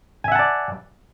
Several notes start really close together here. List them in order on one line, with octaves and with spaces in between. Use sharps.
G#5 E5 F#5 A5 D5